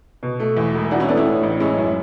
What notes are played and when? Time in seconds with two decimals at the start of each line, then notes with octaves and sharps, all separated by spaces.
0.23 B2
0.40 A3
0.57 E2
0.75 E1
0.91 E3 D4 F#4
1.00 C#4 E4
1.08 A3 B3 D4
1.17 C#4 E4
1.26 A2
1.43 A1
1.60 G#3 C#4 E4
1.77 F#2